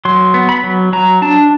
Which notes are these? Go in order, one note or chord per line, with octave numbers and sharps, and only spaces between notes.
F#3 C6
B3
B5
F#3
F#3 A#5
D4 A5